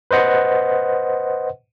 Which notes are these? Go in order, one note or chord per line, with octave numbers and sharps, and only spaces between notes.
B4 C5 D#5 F#5